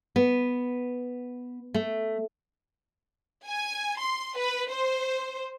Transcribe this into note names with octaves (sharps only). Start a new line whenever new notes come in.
B3
A3
G#5
C6
B4
C5